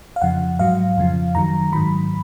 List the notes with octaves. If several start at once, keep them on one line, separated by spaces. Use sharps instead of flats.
F5
F2 C#3 F3 F#5
G#2 F#3 F5
F2 C#3 F3
F#2 D#3 F#3 A#5
G#2 D#3 F#3 B5